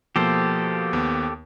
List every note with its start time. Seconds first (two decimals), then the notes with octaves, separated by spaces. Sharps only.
0.16 B2 F3 A#3 G4 A4 C5
0.93 D#2 B3